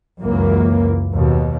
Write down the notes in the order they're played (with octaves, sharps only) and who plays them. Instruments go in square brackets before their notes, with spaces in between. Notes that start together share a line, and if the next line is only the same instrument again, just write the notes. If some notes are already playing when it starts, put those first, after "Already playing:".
[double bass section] C#2 F#2 E3 A#3
D#2 B2